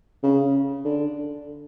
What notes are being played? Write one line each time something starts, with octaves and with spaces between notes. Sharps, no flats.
C#3
D3